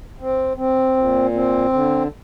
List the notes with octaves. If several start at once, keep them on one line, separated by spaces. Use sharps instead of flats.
C4
C4
A#2
C4
D3